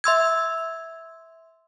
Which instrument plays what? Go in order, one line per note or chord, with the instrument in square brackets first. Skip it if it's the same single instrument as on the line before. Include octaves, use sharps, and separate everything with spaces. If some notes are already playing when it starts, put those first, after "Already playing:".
[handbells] E5 C6 E6 G#6